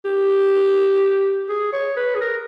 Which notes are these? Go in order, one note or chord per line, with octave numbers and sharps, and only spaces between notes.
G4
G#4
C#5
B4
G#4
A#4